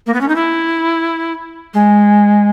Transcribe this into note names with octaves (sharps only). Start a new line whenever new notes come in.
A#3
B3
C#4
D#4
E4
G#3